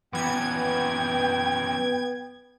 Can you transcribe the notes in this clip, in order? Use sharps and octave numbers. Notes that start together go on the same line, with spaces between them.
F#2 E3 B3 G5 G#6